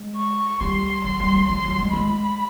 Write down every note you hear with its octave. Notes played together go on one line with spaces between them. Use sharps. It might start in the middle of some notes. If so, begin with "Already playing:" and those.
Already playing: G#3
C#6
G3 C6
F#3 C6
G3
G3
F3 C6
F#3
G#3
G#3 B5